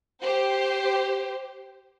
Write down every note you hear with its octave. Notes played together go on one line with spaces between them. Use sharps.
G4 C5